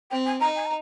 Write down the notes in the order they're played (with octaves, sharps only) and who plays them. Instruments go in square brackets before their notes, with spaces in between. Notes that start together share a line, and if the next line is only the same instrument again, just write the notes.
[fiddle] C4 [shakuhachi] G5
[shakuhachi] G#5
[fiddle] D#4 [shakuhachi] A#5
[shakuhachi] G#5
A#5